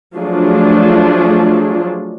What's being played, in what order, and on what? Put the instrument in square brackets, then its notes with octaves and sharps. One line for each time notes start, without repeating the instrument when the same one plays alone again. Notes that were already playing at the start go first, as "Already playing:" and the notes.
[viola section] F3 F#3 A3 D4 F4 G#4